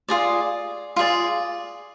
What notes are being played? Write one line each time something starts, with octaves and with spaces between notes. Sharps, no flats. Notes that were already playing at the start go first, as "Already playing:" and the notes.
F4 G#4 D5
F4 G#4 D5